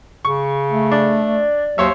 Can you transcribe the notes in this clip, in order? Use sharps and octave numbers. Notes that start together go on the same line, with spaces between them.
C#3 C#6
A3
D4 D5
D#2 F#3 C5 C#5 E5